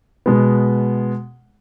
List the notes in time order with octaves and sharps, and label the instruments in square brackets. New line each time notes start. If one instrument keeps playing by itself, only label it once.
[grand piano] B2 G#3 B3